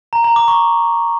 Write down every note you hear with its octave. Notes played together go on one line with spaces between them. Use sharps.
A#5
A#5
D6
C#6